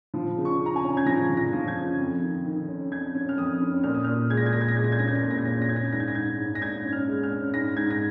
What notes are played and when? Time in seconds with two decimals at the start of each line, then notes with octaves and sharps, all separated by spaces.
0.14 F3
0.37 C#3
0.45 C#6
0.60 C#3
0.66 A#5
0.76 G#5
0.84 C#4
0.97 G#6
1.06 F3 A#6
1.30 F3
1.37 A#6
1.53 F3
1.68 G#6
1.76 C#3
1.99 F2
2.22 D#3
2.45 D#3
2.69 C#4
2.92 F2 G#6
3.14 C#4
3.29 F6
3.38 F2 D#6
3.61 C#4
3.83 A#2 F6
3.94 D#6
4.04 A#2 F6
4.30 G#3 G#6
4.37 A#6
4.46 G#6
4.53 A#2 A#6
4.61 G#6
4.68 A#6
4.76 G#3 G#6
4.84 A#6
4.92 G#6
4.99 C#4 A#6
5.08 G#6
5.15 A#6
5.23 A#2 G#6
5.31 A#6
5.38 G#6
5.45 C#4 A#6
5.53 G#6
5.62 A#6
5.68 C#4 G#6
5.76 A#6
5.85 G#6
5.92 G#2 A#6
6.00 G#6
6.08 A#6
6.15 G#2 G#6
6.38 G#2
6.55 A#6
6.61 G#2 G#6
6.84 C#4
6.92 F6
7.08 G#3
7.23 F6
7.30 C#4
7.54 G#2 A#6
7.76 G#2 G#6
7.90 A#6